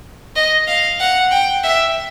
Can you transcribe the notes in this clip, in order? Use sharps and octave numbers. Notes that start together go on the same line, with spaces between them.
D#5
F5
F#5
G5
E5